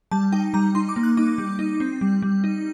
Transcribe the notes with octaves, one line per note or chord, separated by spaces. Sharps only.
G3 A5
D#4 G5
G3 A#5
D#4 C6
D6
A#3
F#6
D#4 D6
G3
D#4
C4
G3
G3
D#4